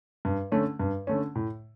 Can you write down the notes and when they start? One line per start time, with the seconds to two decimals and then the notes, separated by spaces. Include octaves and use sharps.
0.25 G2
0.52 D3 A3 C#4
0.80 G2
1.07 D3 A3 C#4
1.35 A2